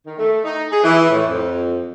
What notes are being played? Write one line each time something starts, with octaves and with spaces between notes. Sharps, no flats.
D#3
A3
D#4
G#4
E3
A2
F2